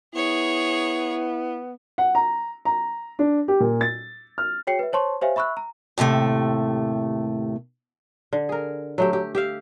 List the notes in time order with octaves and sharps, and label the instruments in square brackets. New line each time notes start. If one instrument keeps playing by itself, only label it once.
[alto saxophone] B3 [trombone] E4 [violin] G#4 C#5
[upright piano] F#5
A#5
A#5
D4
G4
A#2
A6
F6
[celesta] F#4 G#4 C#5 G5 C7 C#7
B4 E5
C5 C#5 A5 C6 C#6
G4 C5 C#5 E5 F5 G#5
E5 B5 C#6 E6 F#6
A#5
[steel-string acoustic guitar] D#2 A2 C3 A3
[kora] D3
G#4 A#4
F#3 A3 G4
G4
G4 E5 F5